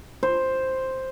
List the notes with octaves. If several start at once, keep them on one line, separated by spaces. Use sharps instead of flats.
C5